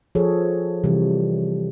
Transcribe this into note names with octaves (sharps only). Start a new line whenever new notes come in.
F3 G#4 A4 C#5
C3 E3 G3